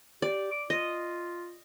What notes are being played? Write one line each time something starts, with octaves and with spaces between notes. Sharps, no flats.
G4 D5
D6
F4 D#5